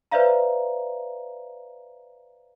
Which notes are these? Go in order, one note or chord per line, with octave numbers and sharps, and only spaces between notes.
B4 C5 D5 E5 F5 A#5